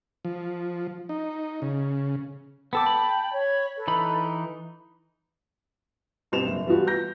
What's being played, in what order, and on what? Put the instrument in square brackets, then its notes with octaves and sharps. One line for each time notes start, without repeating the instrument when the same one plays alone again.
[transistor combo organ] F3
D#4
C#3
[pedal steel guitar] B3 A4 D6 [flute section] G5 A5
[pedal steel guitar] B5
[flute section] C#5
A4 B4
[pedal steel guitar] E3 D#4 B5
[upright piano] G2 B2 C4 E7 F7
F#1
E3 F3 G3 B3 F4 F#4
G6 A#6